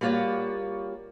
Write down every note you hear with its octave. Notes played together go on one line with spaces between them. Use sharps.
G3 A#3 F4 F#4 C#5 D5